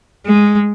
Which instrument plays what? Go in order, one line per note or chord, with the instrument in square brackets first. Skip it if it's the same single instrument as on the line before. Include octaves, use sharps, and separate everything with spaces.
[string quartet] G#3